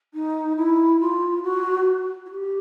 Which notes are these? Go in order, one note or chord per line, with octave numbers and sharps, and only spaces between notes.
D#4
E4
F4
F#4
F#4
G4